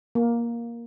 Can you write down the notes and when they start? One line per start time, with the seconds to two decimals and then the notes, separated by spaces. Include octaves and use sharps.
0.15 A#3